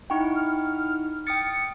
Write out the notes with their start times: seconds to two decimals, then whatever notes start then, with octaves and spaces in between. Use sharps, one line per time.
0.10 D#4 E4 F#5 G5 C#6
0.36 F6
1.27 G5 D#6 A6 C#7